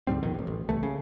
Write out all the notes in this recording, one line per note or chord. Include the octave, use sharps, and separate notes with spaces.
D2 G#2 G3 C4
A#1 F2 B2 D#3
A1 E2
A1
C2 E3 A3
C#3